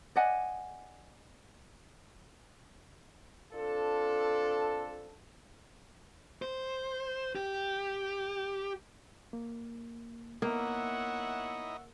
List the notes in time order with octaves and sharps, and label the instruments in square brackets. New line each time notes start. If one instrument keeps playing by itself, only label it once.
[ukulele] D5 D#5 F#5 G#5
[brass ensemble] C4 D4 F4 A4
[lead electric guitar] C5
G4
[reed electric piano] A#3
[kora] A#3 [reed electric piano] B3 [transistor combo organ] D#4 E4 D#5 [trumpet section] C#5 E5 F#5